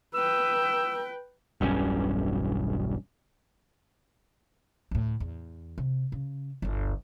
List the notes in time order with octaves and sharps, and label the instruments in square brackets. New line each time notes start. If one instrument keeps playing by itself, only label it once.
[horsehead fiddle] B4 G5 [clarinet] E6
[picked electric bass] E1 B1 G2 C#4
[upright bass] D2 A2
E2
C3
C#3
G1 D2